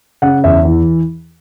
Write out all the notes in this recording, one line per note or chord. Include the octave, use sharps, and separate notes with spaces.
C#3 F#5
E2 E5
E3